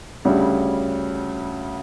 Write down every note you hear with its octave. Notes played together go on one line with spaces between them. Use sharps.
D2 C#3 G3